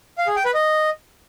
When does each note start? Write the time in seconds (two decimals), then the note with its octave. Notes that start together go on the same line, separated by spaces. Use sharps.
0.18 F5
0.27 G#4
0.36 G5
0.45 B4
0.54 D#5